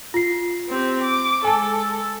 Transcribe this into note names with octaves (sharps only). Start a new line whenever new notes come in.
F4 C7
C4 G4
D6
G#3 A4 G#5 A5